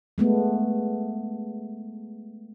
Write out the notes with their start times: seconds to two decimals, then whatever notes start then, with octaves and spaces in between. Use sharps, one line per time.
0.18 G#3 A3 B3